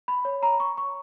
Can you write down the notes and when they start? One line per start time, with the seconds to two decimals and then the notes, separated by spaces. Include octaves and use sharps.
0.08 B5
0.25 C#5
0.43 A#5
0.60 C#6
0.77 C#6